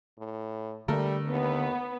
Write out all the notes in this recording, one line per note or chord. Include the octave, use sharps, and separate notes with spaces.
A2
D3 G3 A3 A4 A#4
D#2 B3